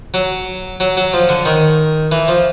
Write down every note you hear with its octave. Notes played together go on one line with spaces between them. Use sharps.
F#3
F#3
F#3
F3
D3
D#3
E3
F3